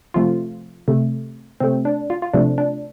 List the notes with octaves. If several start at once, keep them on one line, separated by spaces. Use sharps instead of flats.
C3 F3 A3 F4
C3 A3
C3 A3 C4
D4
F4
F4
C3 F3 A3 D4
D4